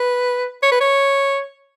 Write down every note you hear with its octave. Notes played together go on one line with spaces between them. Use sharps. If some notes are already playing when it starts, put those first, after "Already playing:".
Already playing: B4
C#5
B4
C#5